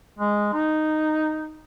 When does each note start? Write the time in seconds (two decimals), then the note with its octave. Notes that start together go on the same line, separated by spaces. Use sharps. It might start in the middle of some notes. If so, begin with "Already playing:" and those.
0.18 G#3
0.53 D#4